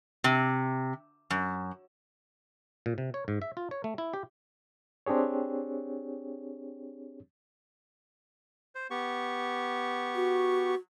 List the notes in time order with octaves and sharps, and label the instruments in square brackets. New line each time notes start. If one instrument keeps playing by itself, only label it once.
[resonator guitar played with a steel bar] C3
F#2
[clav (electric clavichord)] A#2
C3
C#5
G#2
E5
F4
C#5
A3
E4
G4
[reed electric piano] C4 D4 G4 G#4 C#5
[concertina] C5
B3 G4 C#6
[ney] F#4